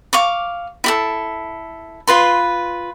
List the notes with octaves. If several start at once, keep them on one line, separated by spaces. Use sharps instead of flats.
F5 C#6 D6
E4 G4 A4
F4 B4 C6